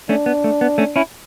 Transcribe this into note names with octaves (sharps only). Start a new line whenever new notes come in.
A3 C#4 D4
B3
A3
B3
A3 C#4
C#4 E4